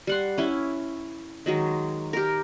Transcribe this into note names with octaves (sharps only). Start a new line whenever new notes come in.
G3 F#5 C6
C#4 E4
D#3 F#3 G#3
G4 A#4